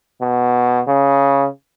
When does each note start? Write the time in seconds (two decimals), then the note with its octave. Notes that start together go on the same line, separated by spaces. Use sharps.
0.21 B2
0.88 C#3